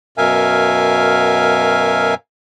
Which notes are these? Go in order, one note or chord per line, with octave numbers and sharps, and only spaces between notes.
F#2 B2 A#4 E5 F5 G#5